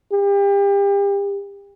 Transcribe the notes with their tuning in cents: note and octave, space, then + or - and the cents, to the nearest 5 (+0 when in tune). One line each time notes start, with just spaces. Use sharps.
G4 +35